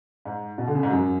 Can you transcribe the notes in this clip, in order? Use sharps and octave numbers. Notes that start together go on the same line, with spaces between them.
G#2
B2
D3
C#3
G#2
F#2